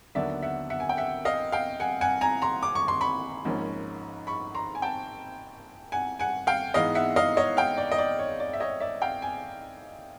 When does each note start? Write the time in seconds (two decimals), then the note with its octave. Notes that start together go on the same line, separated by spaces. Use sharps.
0.15 D#2 D3 F#3 B3 D5 E5
0.42 E5 F#5
0.70 E5 F#5
0.80 G#5
0.89 G5
0.97 E5 F#5
1.25 D#5 F5
1.52 F5 G5
1.80 F#5 G#5
2.01 F#5 G#5
2.21 G#5 A#5
2.42 A#5 C6
2.63 D6
2.75 C#6
2.88 C6
3.01 B5 C#6
3.45 G#1 G#2 F3 A#3 C#4
4.27 B5 C#6
4.55 A#5 C6
4.75 G#5
4.82 G5 A5
5.92 F#5 G#5
6.20 F#5 G#5
6.47 F5 G5
6.74 G#2 E3 G#3 B3 D#5 F5
6.95 E5 F#5
7.16 D#5 F5
7.37 C#5 D#5
7.57 F5 G5
7.78 D5
7.92 D#5
7.98 D5
8.19 C#5
8.40 D5
8.53 E5
8.60 C#5 D#5
8.80 D5 E5
9.02 F5 G5
9.22 G#5